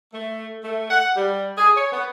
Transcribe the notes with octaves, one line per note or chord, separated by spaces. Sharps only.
A3
A3
F#5
G3
G#4
C#5
B3